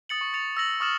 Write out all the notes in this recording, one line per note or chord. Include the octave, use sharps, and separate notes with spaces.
D#6 A6 C#7 F#7
C#6
A6 C#7 F7
E6 A#6 F#7
C#6 D#6 F6 A6 E7 F#7